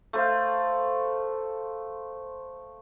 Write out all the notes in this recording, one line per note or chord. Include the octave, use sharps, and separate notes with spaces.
A3 C5 F5